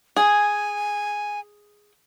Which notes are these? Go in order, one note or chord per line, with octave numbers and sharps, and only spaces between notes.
G#4 G#5